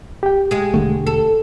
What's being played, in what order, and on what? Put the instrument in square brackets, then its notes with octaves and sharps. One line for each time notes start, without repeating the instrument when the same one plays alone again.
[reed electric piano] G4 G5
[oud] G#3 G#4
[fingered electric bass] E1 D3 A3
[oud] A4